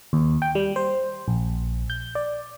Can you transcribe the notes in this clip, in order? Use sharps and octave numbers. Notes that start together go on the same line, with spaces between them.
D#2
G5
G3
C5
A#1
G6
D5